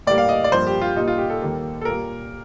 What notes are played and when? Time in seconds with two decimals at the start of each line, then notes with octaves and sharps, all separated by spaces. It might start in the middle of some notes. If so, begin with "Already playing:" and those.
0.07 A2 G3 A#3 D5
0.18 F5
0.29 D#5
0.44 D5
0.52 G2 F3 A#3 C5
0.67 G4
0.81 F4
0.96 A#2 G3 A#3 D#4
1.08 F4
1.18 G4
1.30 A4
1.41 D#2 D#3 G3 A#3
1.81 A4
1.85 A#2 G3 A#3 A#4